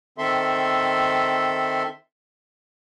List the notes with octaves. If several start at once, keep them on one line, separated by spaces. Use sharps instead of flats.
D#3 C4 A4 E5 C6